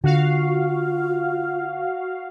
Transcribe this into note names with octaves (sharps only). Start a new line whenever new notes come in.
D3 F4 F#4 F5